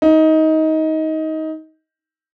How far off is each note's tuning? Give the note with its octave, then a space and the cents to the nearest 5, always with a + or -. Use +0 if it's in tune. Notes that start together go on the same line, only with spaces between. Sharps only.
D#4 +20